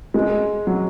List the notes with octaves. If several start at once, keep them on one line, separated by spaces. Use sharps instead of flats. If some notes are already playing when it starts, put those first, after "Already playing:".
G#3
F#3